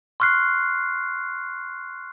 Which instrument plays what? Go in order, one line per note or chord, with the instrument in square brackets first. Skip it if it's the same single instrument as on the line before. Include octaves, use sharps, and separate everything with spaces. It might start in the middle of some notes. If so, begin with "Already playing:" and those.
[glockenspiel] C6 C#6 F6 F#6 C7